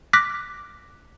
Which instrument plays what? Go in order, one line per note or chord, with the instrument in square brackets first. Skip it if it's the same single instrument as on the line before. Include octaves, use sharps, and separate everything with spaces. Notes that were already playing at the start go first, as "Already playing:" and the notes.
[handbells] D6 F6 F#6 A#6 B6